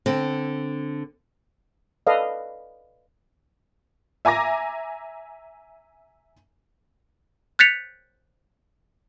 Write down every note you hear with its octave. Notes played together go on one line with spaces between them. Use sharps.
D3 C4
A4 B4 D5 D#5 F5
E5 G#5 A#5 D6 A#6
F#6 G6 A6 B6 C#7 F7